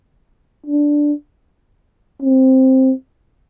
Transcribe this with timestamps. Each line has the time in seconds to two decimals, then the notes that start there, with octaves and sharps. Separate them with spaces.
0.67 D4
2.22 C4